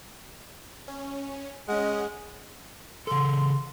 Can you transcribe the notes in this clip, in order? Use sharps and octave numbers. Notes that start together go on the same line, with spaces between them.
C#4
G#3 C#4 D#5 F#5
C#3 A4 C6